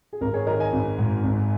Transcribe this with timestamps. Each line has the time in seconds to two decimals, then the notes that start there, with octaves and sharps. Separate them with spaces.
0.13 G#4
0.21 G#1 A#4
0.34 G#4 C#5
0.46 D#3 A#4 D#5
0.60 D#5 G#5
0.72 G#1
0.98 G#2
1.24 G#1